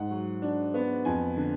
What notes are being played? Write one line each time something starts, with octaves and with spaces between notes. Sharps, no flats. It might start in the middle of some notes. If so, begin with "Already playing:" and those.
Already playing: G#2 F#5
F#3
D4
B3
F2 G#5
D3